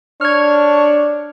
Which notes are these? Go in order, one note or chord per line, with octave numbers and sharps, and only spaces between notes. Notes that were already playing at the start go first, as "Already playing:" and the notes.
D4 C#5 F6 G#6